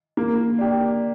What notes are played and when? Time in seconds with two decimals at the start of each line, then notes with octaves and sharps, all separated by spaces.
0.17 A#3
0.58 D4 G4